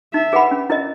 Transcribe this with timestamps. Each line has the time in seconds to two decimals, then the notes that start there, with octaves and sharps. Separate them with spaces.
0.14 D#4 E5
0.33 G#4 B4 F#5 B5
0.51 C#4
0.70 E4 A#4 D#5